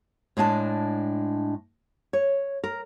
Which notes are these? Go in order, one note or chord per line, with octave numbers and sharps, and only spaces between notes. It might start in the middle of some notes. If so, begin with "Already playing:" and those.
A2 G#3 D4 G#5 A5
C#5
A#4